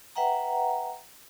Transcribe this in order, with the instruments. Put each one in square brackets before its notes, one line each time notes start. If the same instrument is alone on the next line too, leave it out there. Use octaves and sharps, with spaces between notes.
[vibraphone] B4 E5 F#5 G5 A#5